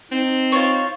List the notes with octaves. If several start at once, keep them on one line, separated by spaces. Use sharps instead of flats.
C4 D#4
F4 C#5